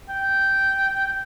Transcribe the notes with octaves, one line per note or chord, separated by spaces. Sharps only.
G5